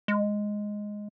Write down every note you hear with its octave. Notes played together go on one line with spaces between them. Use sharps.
G#3